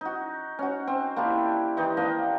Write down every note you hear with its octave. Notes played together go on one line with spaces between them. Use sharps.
D#4 F#4
C#4 F#4
C4
A#3 D4 E4 G4
E3 D#4 G4
A#3 D4 D#5